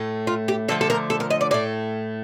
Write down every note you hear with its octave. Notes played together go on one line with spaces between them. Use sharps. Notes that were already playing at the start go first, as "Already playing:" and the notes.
Already playing: A2 A3
F4
G4
D3 F3 A3 A4
A4
A#4
A4
A#4
D#5
D5
A2 A3 D5